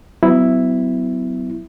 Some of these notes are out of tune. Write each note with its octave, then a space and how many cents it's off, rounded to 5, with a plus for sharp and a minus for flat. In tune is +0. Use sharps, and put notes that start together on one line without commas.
F#3 +10 B3 +35 E4 +0